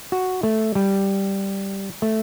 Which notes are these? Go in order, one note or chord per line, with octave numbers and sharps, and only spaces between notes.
F#4
A3
G3
A3